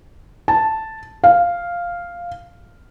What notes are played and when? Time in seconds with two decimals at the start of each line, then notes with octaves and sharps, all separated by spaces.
0.48 A5
1.24 F5